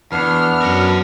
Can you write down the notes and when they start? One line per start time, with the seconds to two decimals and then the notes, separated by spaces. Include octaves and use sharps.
0.12 E2 B3 D4 F6
0.62 F#2 A#4 F#5